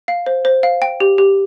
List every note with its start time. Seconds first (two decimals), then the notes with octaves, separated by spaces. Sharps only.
0.08 F5
0.26 C5
0.45 C5
0.63 F5
0.82 G5
1.00 G4
1.18 G4